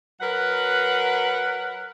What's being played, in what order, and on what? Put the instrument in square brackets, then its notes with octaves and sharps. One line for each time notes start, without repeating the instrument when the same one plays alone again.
[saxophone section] F#3 A#4 B4 F#5